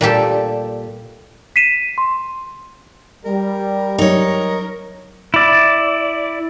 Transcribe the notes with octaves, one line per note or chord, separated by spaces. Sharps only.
A#2 G3 G4 A4
B6 C7 D#7 E7
C6
G3 A#4
F#3 D#4 A#4 C#5
E4 D5